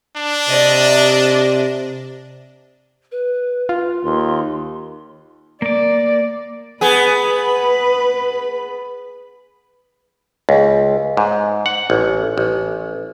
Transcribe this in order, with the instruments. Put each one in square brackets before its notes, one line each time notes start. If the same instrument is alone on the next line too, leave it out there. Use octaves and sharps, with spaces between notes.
[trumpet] D4
[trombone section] C3 [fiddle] D5 D#5
[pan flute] B4
[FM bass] F4
[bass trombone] D#2 [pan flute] C6
[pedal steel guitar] A#3 D6 [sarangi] D5
[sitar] B3 G#4 [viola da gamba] B4
[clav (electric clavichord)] C#2
G#2
F#5
A1
A1